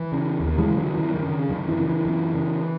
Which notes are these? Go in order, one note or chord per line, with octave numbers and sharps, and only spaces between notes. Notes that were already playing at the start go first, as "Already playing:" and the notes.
Already playing: E3
C#3
D#2
E3 G#3
C#3
D#3 F#3
F#2 E3
D#3
C#3
F#2 D#3
E3
C#3
E3
F#2
C#3